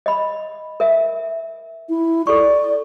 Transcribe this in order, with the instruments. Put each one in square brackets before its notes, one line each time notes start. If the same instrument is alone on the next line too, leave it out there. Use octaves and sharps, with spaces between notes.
[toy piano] D#5 B5
A#4 E5
[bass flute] E4
[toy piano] A4 C#6 [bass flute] D5